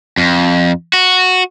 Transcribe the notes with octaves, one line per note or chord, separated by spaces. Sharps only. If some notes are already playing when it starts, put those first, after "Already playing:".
F2
F#4